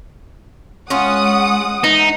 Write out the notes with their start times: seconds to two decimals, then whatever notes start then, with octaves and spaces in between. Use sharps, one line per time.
0.90 G#3 C#4 F4 F#5 D#6
1.84 E3 D#4